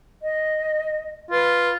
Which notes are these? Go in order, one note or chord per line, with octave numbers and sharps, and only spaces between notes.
D#5
F4 B4